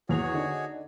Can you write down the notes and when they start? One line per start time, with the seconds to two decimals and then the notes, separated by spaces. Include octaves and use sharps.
0.09 E2 F#4 G#4 C#5 F7
0.33 D3 D4 D#4